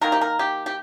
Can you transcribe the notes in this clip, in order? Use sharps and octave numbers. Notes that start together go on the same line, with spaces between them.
D#3 A#3 A#4
G4
A#4
G4
G4